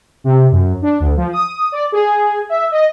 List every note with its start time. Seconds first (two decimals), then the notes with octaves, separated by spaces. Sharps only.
0.24 C3
0.51 F#2
0.82 D4
1.00 D2
1.17 F3
1.32 D#6
1.72 D5
1.92 G#4
2.49 E5
2.71 D#5